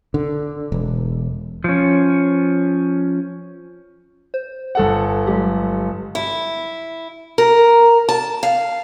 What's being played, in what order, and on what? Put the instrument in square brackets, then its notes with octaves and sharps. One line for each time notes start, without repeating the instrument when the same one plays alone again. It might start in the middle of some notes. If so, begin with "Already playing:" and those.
[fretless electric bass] D3
E1
[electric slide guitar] F3 C#4
[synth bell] C5
[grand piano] G1 A4 F#5
[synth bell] F#3 G#3 G4
[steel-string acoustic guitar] E4
A#4
A5
F5